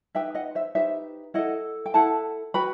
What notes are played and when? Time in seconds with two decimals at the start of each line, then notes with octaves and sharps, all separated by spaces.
0.15 D#4 G4 B4 E5 G5
0.35 D#5 F#5
0.55 C5 E5
0.75 D#4 G4 B4 C5 E5
1.34 E4 A4 D#5 F#5
1.86 G5
1.94 E4 A4 F#5 A5
2.54 F#4 B4 G5 B5